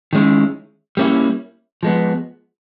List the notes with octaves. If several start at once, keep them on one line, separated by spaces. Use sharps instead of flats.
D#3 G#3 C#4 E4
G3 A#3 C#4 E4
F3 G#3 B3